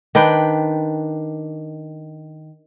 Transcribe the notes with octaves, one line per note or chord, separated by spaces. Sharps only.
D#3 D4 B4 G5